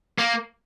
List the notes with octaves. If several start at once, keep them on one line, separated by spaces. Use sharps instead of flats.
A#3